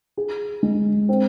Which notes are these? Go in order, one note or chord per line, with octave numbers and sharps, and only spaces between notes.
G#4
G#3
C4